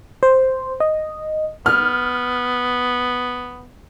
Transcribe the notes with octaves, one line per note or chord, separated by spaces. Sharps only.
C5
D#5
B3 F6